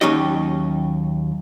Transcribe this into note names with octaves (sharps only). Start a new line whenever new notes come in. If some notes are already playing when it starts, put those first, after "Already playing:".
D#2 F#3 C#4 D#4 G4 D#5